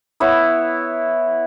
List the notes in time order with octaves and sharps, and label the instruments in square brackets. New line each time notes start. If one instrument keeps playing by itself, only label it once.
[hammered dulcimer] B3 E4 C#5